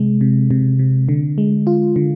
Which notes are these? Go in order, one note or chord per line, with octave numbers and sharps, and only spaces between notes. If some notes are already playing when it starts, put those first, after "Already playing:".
Already playing: C3 G#3
C3
C3
C3
D3
G#3
F4
D3